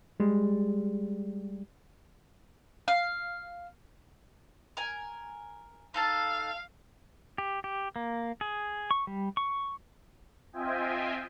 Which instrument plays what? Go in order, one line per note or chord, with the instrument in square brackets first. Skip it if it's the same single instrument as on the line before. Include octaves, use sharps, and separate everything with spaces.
[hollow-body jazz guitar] G3 G#3
[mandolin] F5
A#4 G#5
[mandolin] D#4 A4 A5 [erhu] F5
[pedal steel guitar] G4
G4
A#3
G#4
C#6
G3
C#6
[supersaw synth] C4 F4 D#5 E5 G5 G#5